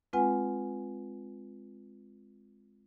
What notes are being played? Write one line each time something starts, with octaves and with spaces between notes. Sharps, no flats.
G#3 C4 F4 B4 F#5 G#5